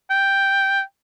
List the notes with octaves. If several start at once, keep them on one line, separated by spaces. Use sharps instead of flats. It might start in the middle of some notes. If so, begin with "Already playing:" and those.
G5